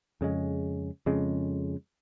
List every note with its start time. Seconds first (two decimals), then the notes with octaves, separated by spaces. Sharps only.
0.21 F2 C#3 G#3
1.06 F2 C#3 G#3